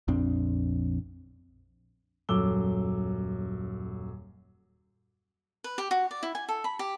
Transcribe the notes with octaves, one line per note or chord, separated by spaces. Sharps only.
A#1 F2 C4 D4
D#1 F#2 A4 D6 E6 G7
B4
G4
F#4
D5
E4
G#5
A4
B5
G4